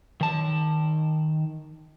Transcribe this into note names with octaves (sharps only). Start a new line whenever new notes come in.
D#3 A5